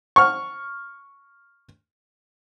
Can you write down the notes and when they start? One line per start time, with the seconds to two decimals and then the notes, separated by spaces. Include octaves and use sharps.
0.16 C#6 F6